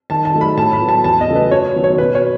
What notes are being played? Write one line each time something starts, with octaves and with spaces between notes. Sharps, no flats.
D#3 A5
A5
F#3 A3 D#4
B5
A2 A5
B5
F#3 B3
A5
E2 A5
D#5
C#3 F#3 A3
B4
F#2 C#5
D#3 F#3 B3
C#5
B2 B4
C#5